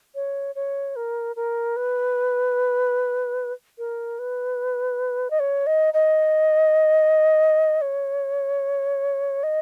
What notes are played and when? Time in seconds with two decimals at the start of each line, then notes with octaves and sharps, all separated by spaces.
0.15 C#5
0.55 C#5
0.96 A#4
1.36 A#4
1.76 B4
3.78 A#4
4.19 B4
5.30 D#5
5.39 C#5
5.66 D#5
5.94 D#5
7.81 C#5
9.43 D#5